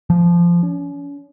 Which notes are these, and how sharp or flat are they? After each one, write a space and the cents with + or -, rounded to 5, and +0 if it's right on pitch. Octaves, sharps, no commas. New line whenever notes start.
F3 -15
C#4 +40